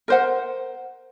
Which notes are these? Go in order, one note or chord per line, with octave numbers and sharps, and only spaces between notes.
A#4 C5 F#5